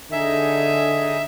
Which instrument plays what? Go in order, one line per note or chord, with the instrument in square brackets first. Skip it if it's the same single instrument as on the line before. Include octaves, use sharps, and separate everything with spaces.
[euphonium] D3 [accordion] D#4 G#4 D#5 [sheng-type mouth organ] E5